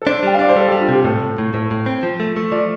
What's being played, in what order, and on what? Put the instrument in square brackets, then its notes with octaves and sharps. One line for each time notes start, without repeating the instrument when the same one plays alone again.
[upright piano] A4
[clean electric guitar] D4 [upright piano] C5
[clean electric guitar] G3 [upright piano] G5
[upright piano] F5
[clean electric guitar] D4 [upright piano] D5
[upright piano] C5
[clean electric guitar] G3 [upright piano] A4
[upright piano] G4
[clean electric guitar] G3
[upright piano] F4
[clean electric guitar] C3 [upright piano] G4
[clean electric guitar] A2 [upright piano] A4
[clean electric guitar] A2
A2
[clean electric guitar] A2 [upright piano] A4
[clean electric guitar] A2
C4
F3
A3
A3
[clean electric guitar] F3 [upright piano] D5